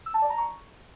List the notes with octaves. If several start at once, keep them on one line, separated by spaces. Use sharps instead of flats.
E6
A5
D5
A#5
C#6